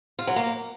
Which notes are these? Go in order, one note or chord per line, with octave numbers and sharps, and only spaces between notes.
F4
F#3
A#3